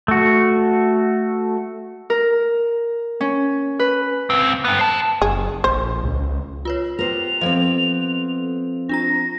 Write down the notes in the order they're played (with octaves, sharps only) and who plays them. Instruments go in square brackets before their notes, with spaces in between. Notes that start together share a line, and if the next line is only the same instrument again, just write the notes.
[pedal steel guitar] A3 F#4
[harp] A#4
C#4
B4
[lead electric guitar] C#2 C4
G2 B3
C5 A5
[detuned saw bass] F#1 [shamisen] G#4
[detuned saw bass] A#1 [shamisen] C5
[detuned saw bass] C#2
[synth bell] F4 B4 C#5
[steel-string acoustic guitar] B3 G4 [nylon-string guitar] A#4 C5 [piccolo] F7
[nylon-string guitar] F3 C4 [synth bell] A4 D#5
[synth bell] D4 F4 A#5 [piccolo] A#6